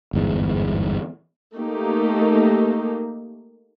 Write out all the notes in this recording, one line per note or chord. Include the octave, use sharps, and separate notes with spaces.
G1 E2 G#2
A3 A#3 D#4 G4